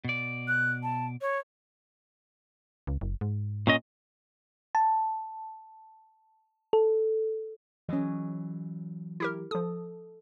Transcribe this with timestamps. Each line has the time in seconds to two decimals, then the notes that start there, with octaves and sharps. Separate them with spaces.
0.05 B2 D5
0.48 F#6
0.83 A5
1.21 C#5
2.87 C#2
3.01 F#1
3.21 G#2
3.67 A#2 C#4 D#5
4.75 A5
6.73 A4
7.89 E3 F#3 C#4 D#5
9.20 E4 G4 A#4
9.51 F3 A4 D#6